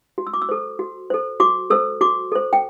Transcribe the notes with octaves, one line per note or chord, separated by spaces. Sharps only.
F#4
E6
D6
E6
A4 C5
F#4
A4 C5
F#4 D6
A4 C5 E6
F#4 D6
A4 C5
G5